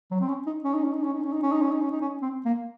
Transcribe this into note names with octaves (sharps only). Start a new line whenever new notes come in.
F#3
C4
C#4
D#4
C#4
D#4
C#4
D#4
C#4
D#4
C#4
D#4
C#4
D#4
C#4
D#4
C#4
D#4
C#4
C4
A#3